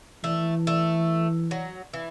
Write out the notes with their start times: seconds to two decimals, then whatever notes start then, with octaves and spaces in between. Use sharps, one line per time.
0.24 E3 A3
0.67 A3
1.51 F#3
1.93 E3